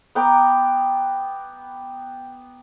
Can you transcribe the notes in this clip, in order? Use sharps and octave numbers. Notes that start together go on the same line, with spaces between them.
B3 G5 A#5 D6